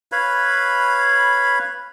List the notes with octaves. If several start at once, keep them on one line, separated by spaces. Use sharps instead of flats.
B4 C#5 F5 B5